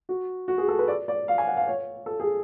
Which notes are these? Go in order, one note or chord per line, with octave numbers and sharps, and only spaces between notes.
F#4
F#4
G#4
A4
B4
D5
D5
F5
G#5
F#5
F5
C#5
A4
G#4